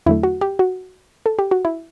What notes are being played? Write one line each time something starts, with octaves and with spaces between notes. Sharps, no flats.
E2 D3 F#3 A3 E4
F#4
G4
F#4
A4
G4
F#4
E4